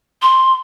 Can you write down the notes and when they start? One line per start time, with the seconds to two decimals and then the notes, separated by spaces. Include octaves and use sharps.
0.22 C6